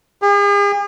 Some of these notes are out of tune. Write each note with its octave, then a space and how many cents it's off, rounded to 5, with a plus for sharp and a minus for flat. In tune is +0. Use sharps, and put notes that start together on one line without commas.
G#4 -45